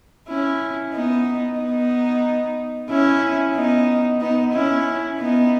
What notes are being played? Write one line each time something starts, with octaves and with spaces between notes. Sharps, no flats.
C#4 E4
B3 D#4
B3 D#4
C#4 E4
B3 D#4
B3 D#4
C#4 E4
B3 D#4